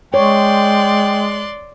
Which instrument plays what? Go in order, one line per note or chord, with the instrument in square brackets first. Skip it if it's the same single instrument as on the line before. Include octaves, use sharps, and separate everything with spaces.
[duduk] G#3 [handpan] C#5 [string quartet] D5 C6 F#6 [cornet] G5